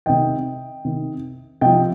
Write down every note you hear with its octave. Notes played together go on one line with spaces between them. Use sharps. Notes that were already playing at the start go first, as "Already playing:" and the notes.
C3 D#3 D#5 G5
C3 D#3
C3 F3 D#5 G5